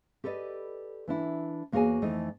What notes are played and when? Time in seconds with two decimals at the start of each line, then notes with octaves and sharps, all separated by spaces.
0.24 G4 A4 B4 D5 D#5
1.08 E3 D4 E4
1.72 E2 A#3 F#4 G#4 C#5 G#5
2.02 F2 E3 A3 D#4 D#5